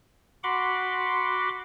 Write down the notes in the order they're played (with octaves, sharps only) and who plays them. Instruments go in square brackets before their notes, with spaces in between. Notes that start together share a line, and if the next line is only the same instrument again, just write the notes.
[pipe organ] F#4 F#5 B5 C6 D6